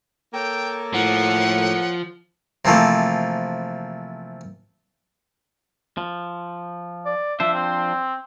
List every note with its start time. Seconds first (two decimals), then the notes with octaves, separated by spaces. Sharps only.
0.33 A#3 A4 C#5 G5
0.94 A2 F3 F#5
2.65 C3 E3 F3 A3 A#3
5.97 F3
7.06 D5
7.40 F3 D4 C5 E5
7.54 C4